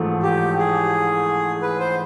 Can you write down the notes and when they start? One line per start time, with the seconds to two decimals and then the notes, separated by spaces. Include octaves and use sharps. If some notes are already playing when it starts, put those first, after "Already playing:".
Already playing: A1 G#2 F3 A3
0.23 G4
0.58 G#4
1.62 B4
1.80 C5